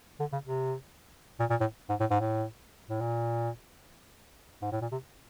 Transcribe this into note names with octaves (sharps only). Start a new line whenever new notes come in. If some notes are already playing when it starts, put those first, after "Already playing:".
D3
C#3
C3
A#2
A#2
A2
G#2
A2
G#2
A2
A2
A#2
G#2
A2
A#2
C3